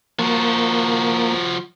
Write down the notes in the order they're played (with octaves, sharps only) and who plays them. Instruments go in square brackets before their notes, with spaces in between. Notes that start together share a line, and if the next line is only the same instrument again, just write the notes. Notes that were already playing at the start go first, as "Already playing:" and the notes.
[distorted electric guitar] F3 F#4 [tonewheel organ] A#3